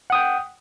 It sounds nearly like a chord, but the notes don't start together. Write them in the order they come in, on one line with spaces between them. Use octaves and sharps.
F#5 D#6 G5